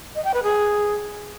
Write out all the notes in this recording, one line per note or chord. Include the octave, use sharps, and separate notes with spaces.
D#5
G5
B4
G#4